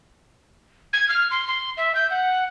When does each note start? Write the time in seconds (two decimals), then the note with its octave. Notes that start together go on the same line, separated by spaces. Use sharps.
0.93 G#6
1.09 F6
1.31 C6
1.47 C6
1.77 E5
1.95 G6
2.10 F#5